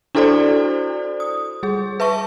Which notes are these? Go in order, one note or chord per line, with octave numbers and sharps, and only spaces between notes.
D4 E4 F#4 A4 C5 D5
D#6
G3 G#4
B4 E5 A5 C#6